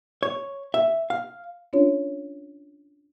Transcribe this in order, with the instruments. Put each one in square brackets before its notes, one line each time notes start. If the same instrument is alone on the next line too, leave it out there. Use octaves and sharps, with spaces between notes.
[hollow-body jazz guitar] C#5
E5
F5
[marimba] C#4 D4 F4 C#5